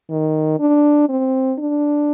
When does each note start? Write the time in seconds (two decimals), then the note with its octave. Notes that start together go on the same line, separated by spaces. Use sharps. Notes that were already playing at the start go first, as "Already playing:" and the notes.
0.10 D#3
0.60 D4
1.09 C4
1.59 D4